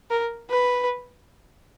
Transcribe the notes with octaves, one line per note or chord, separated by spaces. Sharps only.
A#4
B4